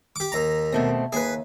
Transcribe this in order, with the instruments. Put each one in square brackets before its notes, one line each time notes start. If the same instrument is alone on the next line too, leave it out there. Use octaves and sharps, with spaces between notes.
[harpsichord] G4 D6
D#2 A#5
[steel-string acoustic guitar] B2 A3 C4
[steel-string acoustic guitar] D#2 [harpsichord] G#4 B4